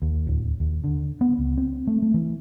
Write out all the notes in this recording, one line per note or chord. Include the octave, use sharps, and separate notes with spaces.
D#2
D1
D#2
D3
B3
C#2
C4
A3
A3
E3